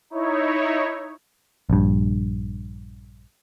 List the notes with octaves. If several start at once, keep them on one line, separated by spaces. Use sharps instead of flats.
D#4 E4 C#5
A#1 G2